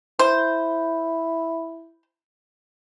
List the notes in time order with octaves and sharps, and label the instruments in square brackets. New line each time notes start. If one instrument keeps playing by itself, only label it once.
[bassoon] E4 [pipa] C5